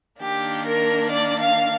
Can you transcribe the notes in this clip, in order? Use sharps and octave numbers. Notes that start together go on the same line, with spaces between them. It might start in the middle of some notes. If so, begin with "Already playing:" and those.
D#3 A#3 D4 G4
A#4
D5
F5